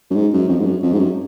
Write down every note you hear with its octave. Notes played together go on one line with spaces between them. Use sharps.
F#2
G#2
F#2
F2
G#2
F#2
F2
G#2
F#2